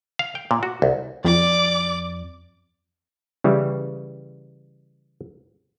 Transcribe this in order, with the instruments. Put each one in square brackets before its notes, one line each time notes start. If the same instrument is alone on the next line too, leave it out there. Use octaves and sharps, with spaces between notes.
[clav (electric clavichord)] F5
G5
A#2
F#4
C2
[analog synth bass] F2 [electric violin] D5 D6
[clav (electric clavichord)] C#3 E3 G3